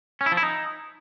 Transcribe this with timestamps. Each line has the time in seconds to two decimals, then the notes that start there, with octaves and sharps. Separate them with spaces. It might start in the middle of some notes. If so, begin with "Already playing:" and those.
0.21 C#4
0.26 E4
0.32 F3
0.37 E4
0.43 D#4